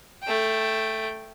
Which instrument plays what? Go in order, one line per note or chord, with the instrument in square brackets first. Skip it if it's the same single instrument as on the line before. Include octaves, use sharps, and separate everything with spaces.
[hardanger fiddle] A3 G5